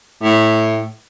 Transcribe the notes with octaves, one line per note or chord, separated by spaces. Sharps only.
A2